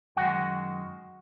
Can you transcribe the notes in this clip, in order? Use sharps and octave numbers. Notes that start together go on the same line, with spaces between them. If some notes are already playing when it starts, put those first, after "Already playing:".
F#2 D#3 G#3 F#4 F#5